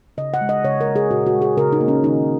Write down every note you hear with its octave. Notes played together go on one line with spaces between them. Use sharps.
C#3 D#5
F#5
G#3
D#5
C#3 C#5
A#4
G#3
G#4
A#2 F#4
F#4
G#3
G#4
C#3 A#4
D#4
A#3
C#4
D#3 D#4